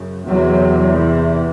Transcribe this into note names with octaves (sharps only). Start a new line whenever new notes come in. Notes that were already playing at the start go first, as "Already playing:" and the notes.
Already playing: F#2 C#3
E2 C3 F#3
E3